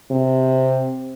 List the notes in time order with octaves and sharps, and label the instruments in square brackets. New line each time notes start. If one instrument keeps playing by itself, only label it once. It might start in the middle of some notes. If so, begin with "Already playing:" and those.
[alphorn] C3